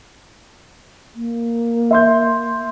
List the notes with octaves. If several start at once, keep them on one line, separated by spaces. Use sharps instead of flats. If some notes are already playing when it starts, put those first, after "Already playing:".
A#3
E5 C6 G6